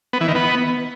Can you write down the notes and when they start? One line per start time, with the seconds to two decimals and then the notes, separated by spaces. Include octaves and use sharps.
0.13 B3
0.21 E3
0.28 D#3
0.35 B3